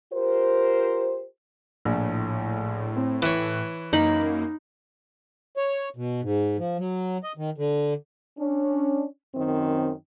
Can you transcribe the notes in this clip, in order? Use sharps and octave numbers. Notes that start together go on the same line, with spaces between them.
F4 G4 A#4 C5
A#1 A2
C4
E3 C#5 F#6
F#2 A#3 D#4 B5
C#5
B2
G#2
F3
F#3
D#5
D#3
D3
C#4 D4
F#2 D#3 C4